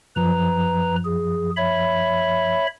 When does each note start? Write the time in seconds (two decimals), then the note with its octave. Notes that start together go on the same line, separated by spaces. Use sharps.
0.16 F#2 F3 B4 A#5
1.05 G#4
1.57 C#5 E5 B5